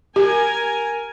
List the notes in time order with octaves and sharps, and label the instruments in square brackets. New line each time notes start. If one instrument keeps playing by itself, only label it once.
[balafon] G4 [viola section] A#4 G#5